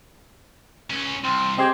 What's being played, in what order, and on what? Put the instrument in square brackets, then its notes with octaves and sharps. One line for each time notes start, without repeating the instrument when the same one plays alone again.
[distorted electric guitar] C#2 C#4
[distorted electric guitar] C2 [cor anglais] C4
[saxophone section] G#3 C4 [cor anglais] G4 [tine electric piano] D#5 C6 G#6